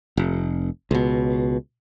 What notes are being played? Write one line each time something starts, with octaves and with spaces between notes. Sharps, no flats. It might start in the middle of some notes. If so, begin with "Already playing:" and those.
F1
C#2 B2